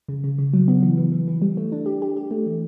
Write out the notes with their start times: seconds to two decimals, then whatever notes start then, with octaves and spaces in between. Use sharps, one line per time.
0.08 C#3
0.24 C#3
0.39 C#3
0.54 F#3
0.68 B3
0.83 E3
0.98 E3
1.12 E3
1.27 E3
1.42 G3
1.57 A3
1.72 D4
1.86 G4
2.02 G4
2.17 G4
2.31 A3
2.46 E3